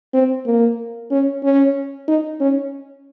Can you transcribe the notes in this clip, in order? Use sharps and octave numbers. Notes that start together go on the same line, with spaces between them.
C4
A#3
C#4
C#4
D#4
C#4